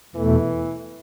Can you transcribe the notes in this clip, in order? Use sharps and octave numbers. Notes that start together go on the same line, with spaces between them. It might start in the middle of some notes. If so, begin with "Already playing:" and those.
E2 B2 E3 A3